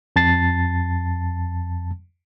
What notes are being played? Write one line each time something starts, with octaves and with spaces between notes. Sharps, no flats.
F2 A5 A6 C7